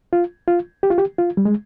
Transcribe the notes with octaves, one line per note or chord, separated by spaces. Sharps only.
F4
F4
G4
F4
G4
F4
G3
G#3